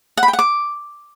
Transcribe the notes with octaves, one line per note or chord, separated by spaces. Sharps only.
F#5
B5
G5
F#5
D6